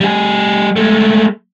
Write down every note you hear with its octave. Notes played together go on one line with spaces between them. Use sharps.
G3 G#4
G#3 A3